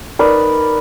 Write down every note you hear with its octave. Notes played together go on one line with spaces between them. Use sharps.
D#4 A#4 B4 D5